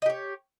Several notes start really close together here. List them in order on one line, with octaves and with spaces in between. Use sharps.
D#5 G4 C#5